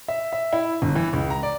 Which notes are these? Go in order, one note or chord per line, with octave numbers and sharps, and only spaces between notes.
E5
E5
E4
G1
E3
C#2
A#5
D5